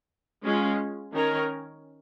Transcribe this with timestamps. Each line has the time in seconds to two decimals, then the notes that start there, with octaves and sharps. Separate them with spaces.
0.43 G#3 C#4 F4
1.12 D#3 C#4 A#4 C#5